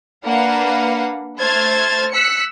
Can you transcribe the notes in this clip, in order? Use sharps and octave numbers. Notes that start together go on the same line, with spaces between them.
A#3 D4 B4 F5 F#5
A3 C5 F6 G#6 A6
E6 F#6 B6 C#7